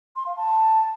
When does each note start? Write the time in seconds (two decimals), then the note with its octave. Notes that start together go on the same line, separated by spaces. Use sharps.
0.16 C6
0.26 F5
0.37 A5